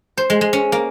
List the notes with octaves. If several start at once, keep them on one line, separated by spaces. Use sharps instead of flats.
C5
G#3
G#3
C#4
A#3